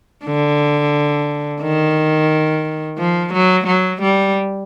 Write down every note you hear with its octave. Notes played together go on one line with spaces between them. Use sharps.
D3
D#3
F3
F#3
F#3
G3